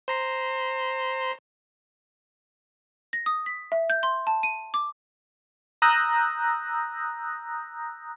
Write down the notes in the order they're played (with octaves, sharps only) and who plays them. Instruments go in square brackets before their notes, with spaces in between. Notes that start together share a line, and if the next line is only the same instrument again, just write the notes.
[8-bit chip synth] C5 A#5 C6
[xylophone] A#6
D#6
B6
E5
G6
C6
A5
D#7
D6
[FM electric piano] A#5 D#6 E6 F#6 G6 A#6